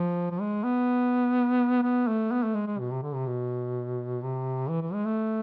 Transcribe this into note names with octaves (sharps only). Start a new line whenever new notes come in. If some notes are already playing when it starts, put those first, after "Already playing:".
Already playing: F3
F3
G#3
B3
B3
A3
B3
A3
G#3
G#3
B2
C3
D3
C3
B2
C3
E3
E3
G#3
A3